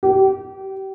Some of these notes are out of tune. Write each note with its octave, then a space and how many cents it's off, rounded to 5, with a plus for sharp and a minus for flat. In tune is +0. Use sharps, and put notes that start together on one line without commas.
G4 -30